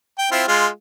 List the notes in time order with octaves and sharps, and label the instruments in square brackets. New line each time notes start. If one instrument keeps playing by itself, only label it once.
[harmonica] G5
C4 E4 F4
G#3 F4